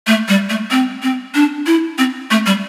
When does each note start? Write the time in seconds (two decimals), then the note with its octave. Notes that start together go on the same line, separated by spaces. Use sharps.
0.07 A3
0.28 G3
0.50 A3
0.71 C4
1.03 C4
1.35 D4
1.66 E4
1.98 C4
2.31 A3
2.46 G3